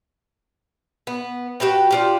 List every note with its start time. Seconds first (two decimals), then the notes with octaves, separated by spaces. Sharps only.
1.07 B3
1.60 F#4 G4 B4 G5
1.91 D4 F4 G4